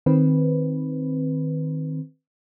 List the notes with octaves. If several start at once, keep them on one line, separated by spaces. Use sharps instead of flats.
D#3 C4 B4